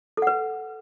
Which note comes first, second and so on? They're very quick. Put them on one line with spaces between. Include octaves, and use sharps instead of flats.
A4 F#5 B4